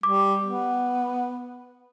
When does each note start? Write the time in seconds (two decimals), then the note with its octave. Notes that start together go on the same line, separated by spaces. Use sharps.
0.03 G3 D6
0.43 B3